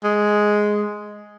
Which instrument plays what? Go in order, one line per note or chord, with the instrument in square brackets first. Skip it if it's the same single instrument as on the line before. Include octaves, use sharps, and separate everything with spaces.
[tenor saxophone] G#3